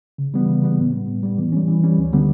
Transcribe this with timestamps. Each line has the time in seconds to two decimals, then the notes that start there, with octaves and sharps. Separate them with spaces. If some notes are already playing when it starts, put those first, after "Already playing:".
0.18 C#3
0.34 E3 G3 B3
0.49 C#3
0.63 E3 G3 B3
0.78 A2
0.93 G3 B3
1.08 A2
1.23 G3 B3
1.38 E3
1.52 G3 C#4
1.68 E3
1.83 G3 C#4
1.98 D2
2.13 D3 G3 B3